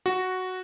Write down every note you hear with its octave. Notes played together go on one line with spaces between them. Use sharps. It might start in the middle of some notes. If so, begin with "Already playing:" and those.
F#4